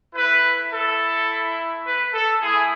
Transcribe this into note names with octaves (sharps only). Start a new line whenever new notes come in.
A3 E4 B4
A4
B4
A4
A3 E4 G#4